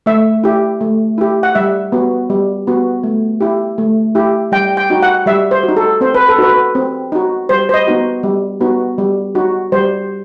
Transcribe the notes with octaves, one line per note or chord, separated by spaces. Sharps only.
A3 E5
E4 G4
A3
E4 G4
F#5
G3 E5
B3 F#4
G3
B3 F#4
A3
E4 G4
A3
E4 G4
G3 G5
G5
D#4 F#4
F#5
G3 E5
C5
F#4
D#4
A4
C4 C5
B4
A4
D#4 F#4 B4
C4
D#4 F#4
G3 C5
C5
D#5
B3 D#4 F#4
G3
B3 D#4 F#4
G3
D#4 F#4
G3 C5